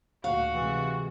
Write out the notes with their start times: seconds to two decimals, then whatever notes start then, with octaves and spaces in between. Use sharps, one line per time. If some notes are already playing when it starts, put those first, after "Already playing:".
0.24 D2 A#2 F#4 F5
0.53 C3 E3 G#3